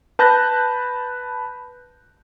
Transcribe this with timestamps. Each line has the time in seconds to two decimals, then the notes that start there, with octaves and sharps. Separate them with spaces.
0.19 B4 A5 F#6 G6 A#6